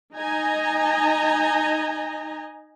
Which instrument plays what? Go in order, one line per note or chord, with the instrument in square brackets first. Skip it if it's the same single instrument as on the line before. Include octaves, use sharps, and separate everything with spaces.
[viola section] D#4 D#5 G#5 A#5